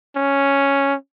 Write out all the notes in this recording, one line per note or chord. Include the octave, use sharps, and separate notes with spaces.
C#4